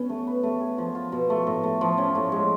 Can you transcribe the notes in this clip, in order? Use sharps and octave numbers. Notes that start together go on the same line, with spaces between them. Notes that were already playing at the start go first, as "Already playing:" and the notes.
Already playing: B3 C#4
A3
B4
A3
G#4
F3
F4
B2
A3
A2
A3
F3
C#4
A2
G#3